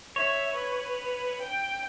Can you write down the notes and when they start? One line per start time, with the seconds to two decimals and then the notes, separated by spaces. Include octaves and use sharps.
0.16 C#5 E5
0.53 B4
1.41 G5